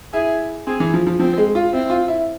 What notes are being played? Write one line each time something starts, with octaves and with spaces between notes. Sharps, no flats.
E4 G#4
C4 G#4
E3
F3
F3
F3 C4
G#3
F4
C4 E4
F4
E4